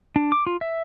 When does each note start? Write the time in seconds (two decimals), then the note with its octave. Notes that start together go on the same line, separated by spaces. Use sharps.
0.16 D4
0.32 D6
0.47 F4
0.61 E5